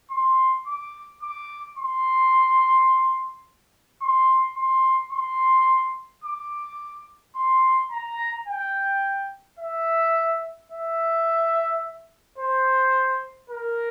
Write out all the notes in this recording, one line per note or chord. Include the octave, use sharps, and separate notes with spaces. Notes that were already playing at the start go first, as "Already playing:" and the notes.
C6
D6
D6
C6
C6
C6
C6
D6
C6
A#5
G5
E5
E5
C5
A#4